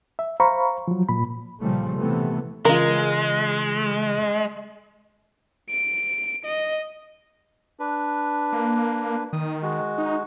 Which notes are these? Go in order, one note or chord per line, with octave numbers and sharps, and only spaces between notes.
E5
C5 F5 A#5 B5 C#6
F3 F#3
A#2 B5
A#2 C#3 F3 G3 A3
C3 E3 A3 B3
C#3 E3 G#3 F4 A#4
D7
D#5
D4 B4
A#3
D#3 D#6
G#3 F#4
D#4